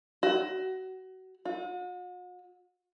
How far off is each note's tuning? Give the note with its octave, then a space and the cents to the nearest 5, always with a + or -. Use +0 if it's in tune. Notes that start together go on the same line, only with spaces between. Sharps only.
F#4 +25
F#4 -45